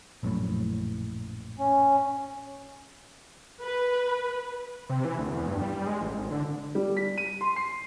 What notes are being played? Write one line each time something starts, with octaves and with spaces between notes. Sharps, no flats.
A#1 F#2 A2
C#4
B4
C3
E3
D2
E2
G2
G3
G#3
A1
G#1
D3
G3
B6
D#7
C6
C7